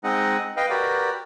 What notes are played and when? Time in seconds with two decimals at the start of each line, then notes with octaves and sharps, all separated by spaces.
0.04 G#3 C4 D#4 D#5 F#5
0.57 B4 D#5 F5 G5
0.70 F#4 G4 A#4 B4 D5